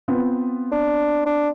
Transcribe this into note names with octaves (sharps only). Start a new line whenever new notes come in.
B3 C4 F4
D4
D4